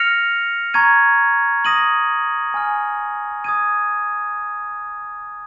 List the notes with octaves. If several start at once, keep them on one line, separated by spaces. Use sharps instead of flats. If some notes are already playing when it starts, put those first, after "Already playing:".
Already playing: F6 A#6 C#7 F7
A#5 C#6 G#6 D#7
D#6 A#6 D#7 F#7
G#5 C#6 F6
D#6 G#6 D#7